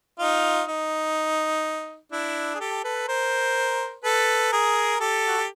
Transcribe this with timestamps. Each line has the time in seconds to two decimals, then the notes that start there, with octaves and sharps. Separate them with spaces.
0.19 D#4 F4
0.68 D#4
2.12 D4 E4
2.55 G#4
2.60 G4 A4
2.84 A4 B4
3.08 A#4 C5
4.04 A4 B4
4.52 G#4 A#4
5.00 G4 A4
5.27 F#4
5.37 G4